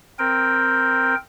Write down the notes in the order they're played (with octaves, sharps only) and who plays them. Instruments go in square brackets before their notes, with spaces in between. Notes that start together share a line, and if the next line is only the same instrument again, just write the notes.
[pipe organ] C4 A#4 G5